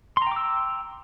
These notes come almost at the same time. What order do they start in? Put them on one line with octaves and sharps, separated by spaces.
C6 A#5 G5 D6 E6